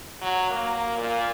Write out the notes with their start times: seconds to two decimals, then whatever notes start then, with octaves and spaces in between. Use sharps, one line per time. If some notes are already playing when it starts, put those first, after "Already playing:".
0.21 F#3
0.50 A#3
0.98 A#2